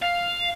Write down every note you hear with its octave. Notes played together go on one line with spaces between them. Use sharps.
F5